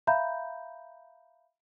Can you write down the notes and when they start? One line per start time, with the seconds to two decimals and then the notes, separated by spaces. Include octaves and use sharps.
0.07 E5 F5 A#5 B5 G6